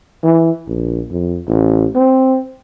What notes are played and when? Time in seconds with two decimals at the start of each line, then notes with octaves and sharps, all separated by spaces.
0.23 E3
0.68 A#1
1.11 F2
1.48 A1
1.95 C4